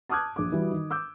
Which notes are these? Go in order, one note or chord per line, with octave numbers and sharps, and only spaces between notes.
A5 D6 D#6 F6 F#6 G#6
A#1 D6
E3 G3 F#4
D#3
D6 E6 G6